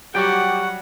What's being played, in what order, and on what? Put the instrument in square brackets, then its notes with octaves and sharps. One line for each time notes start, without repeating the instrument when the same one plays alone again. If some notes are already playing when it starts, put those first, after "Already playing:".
[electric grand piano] F#3 G3 [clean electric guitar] F#4 D5 G5 [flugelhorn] G4 [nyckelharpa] F#5